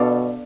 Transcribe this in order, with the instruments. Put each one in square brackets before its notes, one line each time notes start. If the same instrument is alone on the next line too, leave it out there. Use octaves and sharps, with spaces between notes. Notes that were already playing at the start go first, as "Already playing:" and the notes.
Already playing: [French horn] B2 [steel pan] B3 D4 A4 D5 F5